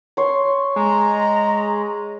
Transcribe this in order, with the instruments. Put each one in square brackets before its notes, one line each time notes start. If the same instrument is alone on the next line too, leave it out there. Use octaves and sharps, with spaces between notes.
[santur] C#5 C6
[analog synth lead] G#3 [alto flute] A#5